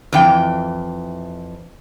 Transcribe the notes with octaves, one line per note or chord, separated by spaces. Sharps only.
F2 E3 G5